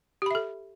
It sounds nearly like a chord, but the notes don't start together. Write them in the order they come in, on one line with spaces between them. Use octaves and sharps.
G4 B5 E5 A4